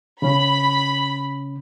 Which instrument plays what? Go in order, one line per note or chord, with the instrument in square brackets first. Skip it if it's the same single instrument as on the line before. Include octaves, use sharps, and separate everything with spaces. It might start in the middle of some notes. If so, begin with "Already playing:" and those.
[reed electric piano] C#3 C#4 [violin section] B5